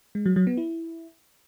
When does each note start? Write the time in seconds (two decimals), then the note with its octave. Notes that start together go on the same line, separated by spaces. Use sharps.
0.15 G#3
0.26 F#3
0.36 F#3
0.47 B3
0.57 E4